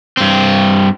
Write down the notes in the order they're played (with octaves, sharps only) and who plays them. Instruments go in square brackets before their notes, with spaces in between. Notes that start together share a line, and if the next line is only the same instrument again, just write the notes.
[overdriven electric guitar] G2 C4